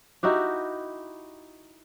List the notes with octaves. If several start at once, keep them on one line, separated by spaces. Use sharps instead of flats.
D#4 E4 F#4 G4